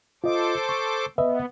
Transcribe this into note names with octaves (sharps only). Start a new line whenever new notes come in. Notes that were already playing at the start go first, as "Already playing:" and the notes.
F4 A4 C5 D#5 D6
C#6
B3 B4 D#5 E5